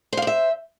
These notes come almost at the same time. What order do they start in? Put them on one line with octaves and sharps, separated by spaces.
C5 F5 D5 E5